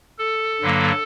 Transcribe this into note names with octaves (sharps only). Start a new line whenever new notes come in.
A4
G2 D3 F#3 A#3